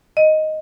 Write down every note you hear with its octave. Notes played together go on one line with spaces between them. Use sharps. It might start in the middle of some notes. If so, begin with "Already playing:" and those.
D#5